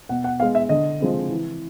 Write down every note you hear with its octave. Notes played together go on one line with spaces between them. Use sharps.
B2 F#5
F#5
G#3 B3 F5
E5
D3 D#5
F3 G#3 C4
E3